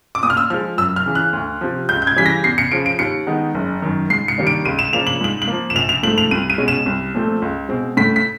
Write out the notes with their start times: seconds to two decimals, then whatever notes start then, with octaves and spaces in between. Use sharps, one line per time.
0.15 D6
0.23 A#2 D#6
0.30 F6
0.37 E6
0.50 F3 F6
0.54 G#3
0.78 F#2 E6
0.96 F6
1.06 C#3 E3
1.15 F#6
1.33 D2
1.61 C3 F3
1.89 C#2 G6
2.02 G6
2.07 G#6
2.16 C#3 E3 G3 B6
2.26 A#6
2.44 E2 C7
2.58 C#7
2.71 C#3 F3 D7
2.86 D7
2.99 D#2 C#7
3.27 D#3 G#3 B3 D#4
3.55 F#1
3.82 F#2 D#3
4.10 G#2 C7
4.28 C#7
4.38 D#3 G3 A#3 D4
4.47 D7
4.65 C#2 D#7
4.79 E7
4.93 C#3 F3 A#3 D4 F7
5.07 F#7
5.21 G#2 F#7
5.42 F#7
5.48 F3 A#3
5.70 E7
5.75 A#1 F7
5.89 F7
6.03 G#2 F3 A3 F#7
6.18 F7
6.31 C2 D#7
6.50 D#7
6.58 B2 G#3 C#4
6.68 E7
6.86 C2
7.14 A#2 F3 A3 C4
7.42 C#2
7.69 B2 G#3 C4
7.97 A2 B6
8.16 B6